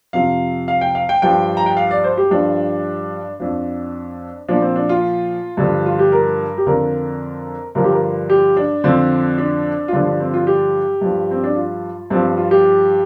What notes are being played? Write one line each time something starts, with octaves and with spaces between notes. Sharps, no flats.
F2 C3 F3 F5
F5
G5
F5
G5
G2 F3 G5
A#5
G5
F5
D5
C5
G4
G2 F3 D4
F2 F3 D4
A#2 F3 D4
C4
D4
F4
G2 D3 F3
F4
G4
A#4
G4
F2 D3 F3 A#4
G2 D3 F3 A#4
G4
A#4
G4
D4
F2 D3 F3 C4
D4
F4
G2 D3 F3 D4
D4
C4
F4
G4
G2 F3
C4
D4
F4
G2 F3 C4
F4
G4